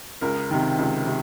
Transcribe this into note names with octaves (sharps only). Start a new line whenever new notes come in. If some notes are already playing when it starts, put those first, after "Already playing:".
C#2 A#4
C3 D#3
C#2
C3 D#3